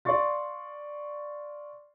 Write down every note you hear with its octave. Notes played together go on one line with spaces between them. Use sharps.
D5 F5 C6 C#6 A6